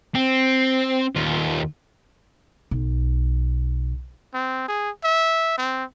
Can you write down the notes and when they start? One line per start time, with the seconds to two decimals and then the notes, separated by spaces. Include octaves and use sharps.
0.15 C4
1.15 D#2 F4
2.71 B1
4.34 C4
4.68 G#4
5.04 E5
5.58 C4